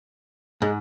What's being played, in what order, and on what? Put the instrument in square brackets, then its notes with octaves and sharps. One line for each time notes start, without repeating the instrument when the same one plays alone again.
[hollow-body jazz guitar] G#2 [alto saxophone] G#3